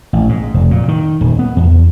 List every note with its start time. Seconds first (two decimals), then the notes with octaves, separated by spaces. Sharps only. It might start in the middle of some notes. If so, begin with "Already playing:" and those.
0.13 A1
0.29 G#2
0.54 F1
0.71 A#2
0.88 D#3
1.21 D#1
1.39 B3
1.57 E2